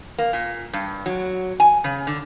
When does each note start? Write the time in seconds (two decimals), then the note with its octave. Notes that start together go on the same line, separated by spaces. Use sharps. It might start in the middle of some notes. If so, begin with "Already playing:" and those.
0.18 A#3
0.33 A#2
0.73 G2
1.06 F#3
1.60 G#5
1.84 C#3
2.07 D3